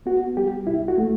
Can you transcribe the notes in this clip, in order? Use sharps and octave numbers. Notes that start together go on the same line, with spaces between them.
B3 F#4
G3 G4
C2 E4
F#4
A3